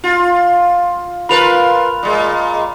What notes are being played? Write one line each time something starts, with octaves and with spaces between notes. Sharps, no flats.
F4
F4 A#4 B4 B5 F7
A#2 G#3